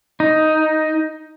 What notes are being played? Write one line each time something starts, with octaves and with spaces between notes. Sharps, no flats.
D#4